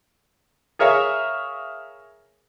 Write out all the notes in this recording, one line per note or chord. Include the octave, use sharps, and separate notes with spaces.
G#4 A#4 C#5 E5 F5